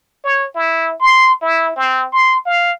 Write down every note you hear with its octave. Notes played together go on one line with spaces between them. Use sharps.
C#5
E4
C6
E4
C4
C6
F5